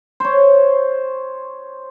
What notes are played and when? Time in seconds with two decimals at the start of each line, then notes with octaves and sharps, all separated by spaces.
0.20 C5 C#5